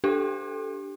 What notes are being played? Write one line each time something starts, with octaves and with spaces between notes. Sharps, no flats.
D4 G4 A4